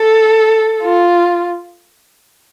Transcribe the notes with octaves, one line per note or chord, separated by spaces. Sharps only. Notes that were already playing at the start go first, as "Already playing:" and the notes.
Already playing: A4
F4